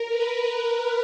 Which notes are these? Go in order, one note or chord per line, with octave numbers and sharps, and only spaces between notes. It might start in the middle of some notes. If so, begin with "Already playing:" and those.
Already playing: A#4
B4